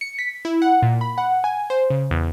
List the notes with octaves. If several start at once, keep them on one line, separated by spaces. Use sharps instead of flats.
C#7
B6
E4
F#5
A#2
B5
F#5
G#5
C5
C#3
E2